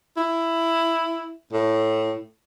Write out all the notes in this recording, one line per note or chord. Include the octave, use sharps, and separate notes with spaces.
E4
A2